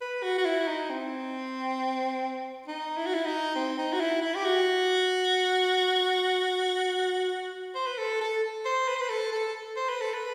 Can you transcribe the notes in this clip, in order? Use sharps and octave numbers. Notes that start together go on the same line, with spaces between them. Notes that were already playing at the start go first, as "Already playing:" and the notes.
B4
F#4
F#4
E4
D#4
C4
D#4
E4
F#4
E4
D#4
C4
D#4
F#4
E4
E4
G4
F#4
C5
B4
A4
A4
C5
B4
C5
B4
A4
A4
C5
B4
A4
B4